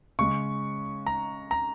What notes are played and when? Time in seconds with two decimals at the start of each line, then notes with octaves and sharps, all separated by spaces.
0.19 C#3 G#3 C#4 C#6
1.06 A#5
1.51 A#5